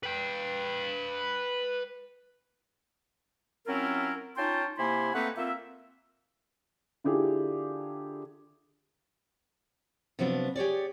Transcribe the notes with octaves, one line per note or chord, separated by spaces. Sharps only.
B4 G5
F#3 C4 C#4 E4 F4 A#4
C#4 D#4 F4 G5 A5 C6
C3 A#3 E4 G#5 B5 C6
A3 A#3 C4 D#4 B4 F#5
A#3 C4 F4 E5
D3 E4 F4 G4 G#4
C3 F3 F#3 B3 D4
G4 G#4 C#5 D5